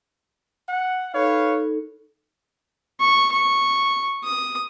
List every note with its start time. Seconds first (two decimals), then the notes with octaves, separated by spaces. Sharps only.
0.69 F#5
1.14 D#4 A4 B4 C#5 F5
3.00 C#6
3.32 C#6
4.24 D#6